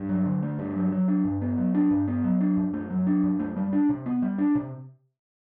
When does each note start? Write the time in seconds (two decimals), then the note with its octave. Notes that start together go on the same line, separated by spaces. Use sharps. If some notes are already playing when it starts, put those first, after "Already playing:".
Already playing: G2
0.09 F#3
0.26 D3
0.42 A3
0.59 G2
0.76 F#3
0.92 F#3
1.08 D4
1.25 G2
1.41 B3
1.58 F#3
1.75 D4
1.91 G2
2.08 B3
2.24 F#3
2.41 D4
2.57 F#2
2.73 A3
2.90 F#3
3.07 D4
3.24 F#2
3.40 A3
3.56 G3
3.73 D4
3.89 C3
4.06 B3
4.22 G3
4.38 D4
4.55 C3